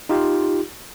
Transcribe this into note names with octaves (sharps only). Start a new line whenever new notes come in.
D#4 F4 G4